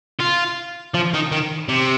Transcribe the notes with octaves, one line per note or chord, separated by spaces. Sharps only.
F4
F3
D#3
D#3
C3